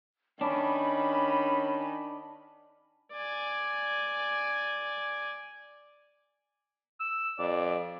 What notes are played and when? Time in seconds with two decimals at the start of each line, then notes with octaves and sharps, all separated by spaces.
0.41 D#3 C#4 D4 B5
3.13 D5 G#5
7.00 E6
7.39 F2 D5